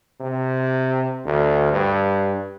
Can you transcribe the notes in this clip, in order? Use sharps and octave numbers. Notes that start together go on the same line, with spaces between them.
C3
D2
G2